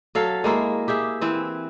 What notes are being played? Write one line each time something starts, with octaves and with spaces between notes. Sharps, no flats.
F#3 A4 F5
G#3 A#3 E4
G4 G#4 E5
E3 C4 E4